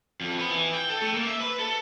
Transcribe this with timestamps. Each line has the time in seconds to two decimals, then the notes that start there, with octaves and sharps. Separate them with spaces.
0.21 F2
0.39 B3
0.50 E3
0.74 G5
0.89 A4
1.02 A3
1.14 A#3
1.26 E5
1.40 B4
1.59 A4